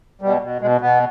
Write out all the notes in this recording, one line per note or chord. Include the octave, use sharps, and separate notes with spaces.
B2 G3
B2
B2 G#3
B2 B3